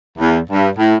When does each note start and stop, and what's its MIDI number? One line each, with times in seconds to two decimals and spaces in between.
0.19 0.38 40
0.50 0.68 43
0.78 0.94 45